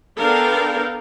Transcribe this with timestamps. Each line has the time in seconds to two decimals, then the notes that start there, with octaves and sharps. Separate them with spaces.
0.18 B3 D4 A4 A#4 F5 G5